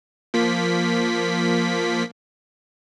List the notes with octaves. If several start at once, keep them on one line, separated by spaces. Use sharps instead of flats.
F3 A#3 B6